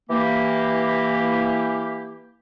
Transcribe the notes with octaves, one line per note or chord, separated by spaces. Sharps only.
E3 A#3 G4